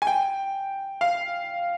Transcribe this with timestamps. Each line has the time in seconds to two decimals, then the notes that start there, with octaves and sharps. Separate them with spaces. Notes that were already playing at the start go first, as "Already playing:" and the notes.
0.02 G#5
0.07 G5
1.01 F5